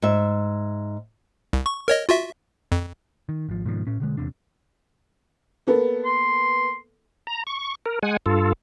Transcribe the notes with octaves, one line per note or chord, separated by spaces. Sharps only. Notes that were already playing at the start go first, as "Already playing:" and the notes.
G#2 E5
C2
C#6
A#4 C#5 D#5
F4 F#4 E5
F2
D#3
G#1 F3
G#2 B2 D#3 F3
A2 C#4
B2 D3 G#3
D#1 E2 C3 D4
A#3 B3 A4
C6
A#5
C#6
A#4
G#3 F#5 G#5
G2 F4 A4